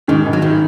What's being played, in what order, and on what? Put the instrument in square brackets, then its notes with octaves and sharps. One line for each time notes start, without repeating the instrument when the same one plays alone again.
[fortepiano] G#2 [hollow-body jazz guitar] D#3
[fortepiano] G#1
[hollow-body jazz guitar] F#3
D#3